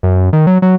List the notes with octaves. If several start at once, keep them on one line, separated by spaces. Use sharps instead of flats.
F#2
D#3
F#3
F#3